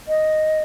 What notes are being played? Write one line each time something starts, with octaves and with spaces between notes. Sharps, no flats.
D#5